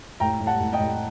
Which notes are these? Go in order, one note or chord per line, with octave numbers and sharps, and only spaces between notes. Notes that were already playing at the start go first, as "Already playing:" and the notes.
A2 G5 A#5
A2
F#5 A5
A2
D#5 G5
A2